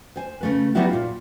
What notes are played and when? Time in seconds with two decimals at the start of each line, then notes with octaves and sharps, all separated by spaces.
0.16 C5 G#5
0.41 C#3 A3 B4
0.75 F#3 G3 B3 D#4 E4 F#4
0.89 A#2 F4